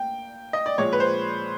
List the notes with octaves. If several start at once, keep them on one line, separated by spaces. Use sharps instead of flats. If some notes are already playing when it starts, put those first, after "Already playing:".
Already playing: A#3 G5
D#5
D5
A#2 F3 G#3 C#5
B4
C5